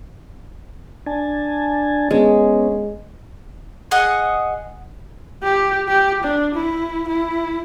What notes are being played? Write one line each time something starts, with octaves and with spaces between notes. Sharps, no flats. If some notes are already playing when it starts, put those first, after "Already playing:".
D4 G#5 A5
G#3 B3 C#4
G#4 D#5 F#5
G4
G4
D4
E4
E4